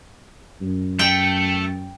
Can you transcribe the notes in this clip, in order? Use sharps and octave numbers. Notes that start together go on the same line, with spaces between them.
F#2
A3 G5